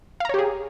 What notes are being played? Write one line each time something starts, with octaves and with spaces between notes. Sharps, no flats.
G4 G#4 C#5 F5 A#5